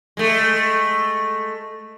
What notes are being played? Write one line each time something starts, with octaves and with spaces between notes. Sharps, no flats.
G#3 A3